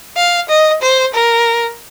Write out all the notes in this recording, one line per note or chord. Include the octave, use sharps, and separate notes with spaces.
F5
D#5
C5
A#4